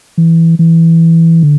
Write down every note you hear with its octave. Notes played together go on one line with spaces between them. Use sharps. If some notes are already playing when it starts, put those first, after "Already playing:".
E3
E3
D3